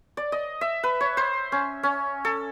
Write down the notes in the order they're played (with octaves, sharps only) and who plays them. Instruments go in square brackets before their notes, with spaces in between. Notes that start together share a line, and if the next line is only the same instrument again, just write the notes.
[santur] D5
D#5
E5
B4
C#5
C5
C#4
C#4
A4